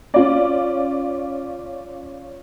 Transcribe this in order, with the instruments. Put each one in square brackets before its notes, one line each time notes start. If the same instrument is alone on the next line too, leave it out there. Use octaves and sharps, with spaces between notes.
[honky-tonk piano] C#4 F4 D5